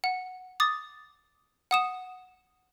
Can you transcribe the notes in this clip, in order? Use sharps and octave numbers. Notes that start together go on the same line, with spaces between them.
F#5
D6 D#6 A6
F#5 D#6 E7